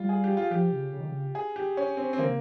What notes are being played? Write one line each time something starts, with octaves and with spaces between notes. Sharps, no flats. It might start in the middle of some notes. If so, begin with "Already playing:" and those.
Already playing: G3 F4
G#4
G4
F4
F3 G4
C#3
C#3
D#3
C#3
G#4
G4
C#4
C4
C4
D#3 A#3
C#3